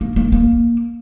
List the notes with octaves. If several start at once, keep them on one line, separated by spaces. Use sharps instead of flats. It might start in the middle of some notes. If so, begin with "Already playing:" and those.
A#3
A#3
A#3